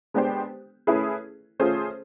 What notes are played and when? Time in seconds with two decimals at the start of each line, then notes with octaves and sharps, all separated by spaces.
0.14 G#3 B3 D4 G4 C5
0.87 A3 C#4 E4 G#4 B4
1.59 A3 C#4 F4 G#4 C5